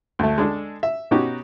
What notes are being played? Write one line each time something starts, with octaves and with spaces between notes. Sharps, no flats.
D2 A3
G#3 D4 A4
E5
B2 C#4 D#4 F#4 G4